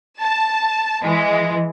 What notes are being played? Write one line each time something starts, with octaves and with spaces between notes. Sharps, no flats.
A5
E3 G#3